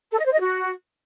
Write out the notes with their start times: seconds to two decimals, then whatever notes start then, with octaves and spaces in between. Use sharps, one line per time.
0.11 A4
0.18 D#5
0.25 C5
0.32 D#5
0.40 F#4